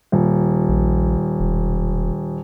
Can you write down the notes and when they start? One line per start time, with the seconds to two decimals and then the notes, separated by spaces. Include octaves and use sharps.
0.12 D#1
0.69 A#1
1.40 E1